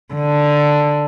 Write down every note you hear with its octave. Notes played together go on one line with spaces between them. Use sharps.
D3